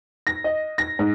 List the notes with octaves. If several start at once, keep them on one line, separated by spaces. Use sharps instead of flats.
A#6
D#5
A#6
G#2